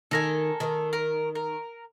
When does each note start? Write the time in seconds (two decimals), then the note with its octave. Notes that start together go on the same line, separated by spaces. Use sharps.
0.11 D#3 A4 A#4 G#5
0.60 D#3
0.93 A#4
1.35 A#4